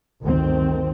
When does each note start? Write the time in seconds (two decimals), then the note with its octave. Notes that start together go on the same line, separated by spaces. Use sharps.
0.23 G1 D2 D#3 C4